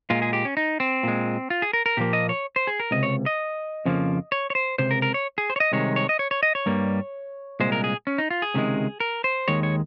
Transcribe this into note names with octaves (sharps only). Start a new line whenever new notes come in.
A#2 G#3 F4
G#4
G4
C#4
D#4
C4
A#2 G#3
F4
G#4
A#4
A#4
A#2 F3 A#3 G4
D#5
C#5
C5
G#4
A#4
C#2 C3 D#5
C#5
D#5
F2 C#3 F3 A#3
C#5
C#5
C5
C#2 C3 C5
A#4
A#4
C#5
G#4
C5
C#5
D#5
C2 C3 D#3 G#3 C#5
C#5
D#5
C#5
C#5
D#5
C#5
G2 G3 A#3
C2 A#2 G#3 C5
A#4
G#4
C#4
D#4
F4
G#4
C#2 C3 D#3 G#3
A#4
C5
D#2 D#3 G#3 C#5
C#5